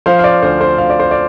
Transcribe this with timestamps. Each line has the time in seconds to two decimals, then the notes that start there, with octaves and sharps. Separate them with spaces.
0.06 F3 C5 F5
0.19 F5
0.24 D5
0.42 D2 C5
0.61 C5
0.78 D2 F5
0.90 D5
1.00 C5
1.11 D5